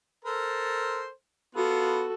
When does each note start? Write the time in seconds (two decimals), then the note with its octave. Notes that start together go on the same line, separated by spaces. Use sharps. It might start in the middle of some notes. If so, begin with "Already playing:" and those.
0.25 A4 A#4 C5
1.55 B3 F4 F#4 A4